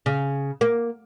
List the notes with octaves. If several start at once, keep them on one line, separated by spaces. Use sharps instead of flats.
C#3
A#3